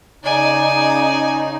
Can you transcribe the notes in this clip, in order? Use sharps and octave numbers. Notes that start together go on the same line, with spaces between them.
C#3 D#4 D5 G#5